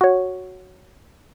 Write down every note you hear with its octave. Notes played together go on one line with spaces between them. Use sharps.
F#4 C#5